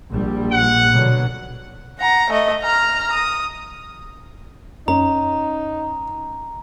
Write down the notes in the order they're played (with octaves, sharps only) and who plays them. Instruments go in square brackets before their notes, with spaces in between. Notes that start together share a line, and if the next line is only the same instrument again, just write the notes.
[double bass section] A#1 G3
[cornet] F#5
[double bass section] B2 D3 F#3
[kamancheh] F#5 A#5
A3 D#5
A#5 F6
D#6
[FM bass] F#2 [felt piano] C#4 [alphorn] D#4 [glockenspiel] A#5